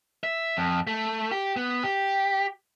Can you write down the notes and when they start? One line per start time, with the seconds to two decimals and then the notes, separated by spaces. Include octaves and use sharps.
0.24 E5
0.57 F2
0.87 A3
1.32 G4
1.57 B3
1.84 G4